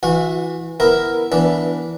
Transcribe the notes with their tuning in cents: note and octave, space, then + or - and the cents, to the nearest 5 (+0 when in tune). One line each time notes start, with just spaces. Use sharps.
E3 +0 F#4 -30 F#5 -45
B3 +0 E4 +5 A#4 +0
E3 +0 B3 -20 D4 -20